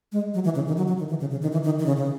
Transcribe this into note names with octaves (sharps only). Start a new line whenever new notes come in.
G#3
F#3
E3
C#3
D#3
F#3
F#3
D#3
E3
C#3
C#3
D#3
E3
D#3
D#3
C#3
C#3